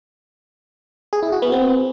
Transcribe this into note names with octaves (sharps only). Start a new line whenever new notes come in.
G#4
E4
F#4
B3
C4